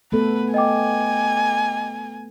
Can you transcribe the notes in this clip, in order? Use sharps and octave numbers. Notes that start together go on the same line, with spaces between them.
A3 B3 A4 B4
D#5 G5 G#5 D6